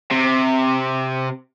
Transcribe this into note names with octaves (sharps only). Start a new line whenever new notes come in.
C3